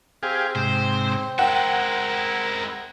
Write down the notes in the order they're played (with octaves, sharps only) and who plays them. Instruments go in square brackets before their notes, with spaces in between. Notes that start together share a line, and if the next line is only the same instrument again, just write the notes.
[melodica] C4 [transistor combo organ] G4 G#4 F5
[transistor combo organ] G#2 C3 [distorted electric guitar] C5
[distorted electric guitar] G#3 E4 [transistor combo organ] A#4 [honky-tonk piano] F#5 G5